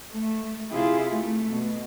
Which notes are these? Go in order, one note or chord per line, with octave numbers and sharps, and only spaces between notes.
A3
C3 E4 F4 G#4
A3
B2